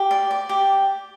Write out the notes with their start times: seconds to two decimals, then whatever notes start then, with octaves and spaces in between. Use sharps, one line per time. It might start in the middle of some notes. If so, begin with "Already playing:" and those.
Already playing: G4
0.11 D5
0.31 D5
0.49 G4